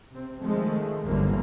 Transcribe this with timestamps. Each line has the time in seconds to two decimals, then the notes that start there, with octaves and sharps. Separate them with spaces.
0.12 C3 C4
0.41 D#3 F3 G#3 A3
1.04 G1 F#2 D3 E3 A#3